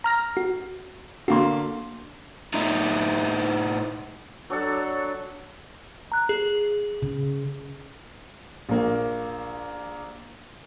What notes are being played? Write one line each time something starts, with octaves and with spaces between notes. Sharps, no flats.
A#5 F6 A#6
F#4
D3 A#3 F#4 C6
A2 D#4 E4
F#3 D4 A4
A#5 F#6
G#4
C#3
A#1 A#3